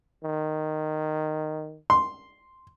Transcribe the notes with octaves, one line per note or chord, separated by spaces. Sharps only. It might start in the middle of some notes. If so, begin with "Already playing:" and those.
D#3
C6